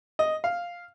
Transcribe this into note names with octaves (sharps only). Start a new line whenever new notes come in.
D#5
F5